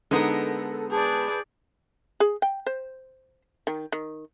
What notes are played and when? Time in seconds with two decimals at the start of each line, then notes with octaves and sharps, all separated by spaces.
0.11 D3 G#3 B3 D#4 A4 A#4
0.91 G#4 B4 D5 A5 G6
2.20 G#4
2.42 G5
2.66 C5
3.67 D#3
3.92 D#3